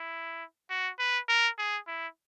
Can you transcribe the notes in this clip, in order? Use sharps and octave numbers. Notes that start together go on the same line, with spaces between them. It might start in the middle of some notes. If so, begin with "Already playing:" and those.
Already playing: E4
F#4
B4
A#4
G#4
E4